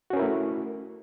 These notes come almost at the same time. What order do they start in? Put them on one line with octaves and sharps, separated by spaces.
F#4 C#4 A#4 E4 A3